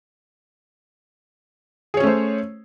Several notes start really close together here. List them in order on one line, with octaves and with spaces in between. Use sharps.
G#4 C#5 C#4 A3 C5